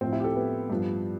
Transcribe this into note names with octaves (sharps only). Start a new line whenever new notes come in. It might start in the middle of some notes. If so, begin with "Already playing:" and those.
A2 F3 C4
E4
G4
A4
B3
G2 F3